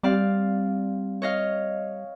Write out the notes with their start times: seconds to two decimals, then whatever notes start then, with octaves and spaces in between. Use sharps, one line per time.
0.03 G3 C4 D5 F5
1.22 C#5 D#5 F5